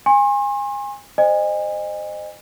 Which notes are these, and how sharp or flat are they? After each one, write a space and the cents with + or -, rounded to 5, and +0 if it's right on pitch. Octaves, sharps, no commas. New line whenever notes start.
G#5 -25 C6 +40
C5 -10 D#5 -30 G#5 -30